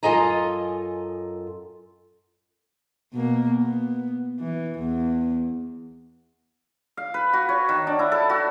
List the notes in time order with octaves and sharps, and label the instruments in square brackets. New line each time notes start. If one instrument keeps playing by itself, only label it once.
[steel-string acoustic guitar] F#2 F4 A4 D#5 G#5 A#5
[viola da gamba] B2 A#3
B3
E3
E2
[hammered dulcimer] F5
B4
F#4
C#5
D#3
D4
E4
A4
F#4